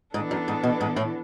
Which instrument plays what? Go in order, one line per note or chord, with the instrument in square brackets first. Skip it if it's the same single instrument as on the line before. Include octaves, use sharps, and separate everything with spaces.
[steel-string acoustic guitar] G#2 [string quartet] E3 B3 D4 A4
[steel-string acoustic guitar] F#2
G#2
B2
G#2
A2